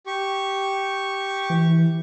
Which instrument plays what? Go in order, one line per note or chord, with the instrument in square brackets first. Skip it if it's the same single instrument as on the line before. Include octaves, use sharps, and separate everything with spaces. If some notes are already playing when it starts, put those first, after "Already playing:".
[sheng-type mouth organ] G4 C#6
[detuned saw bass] E3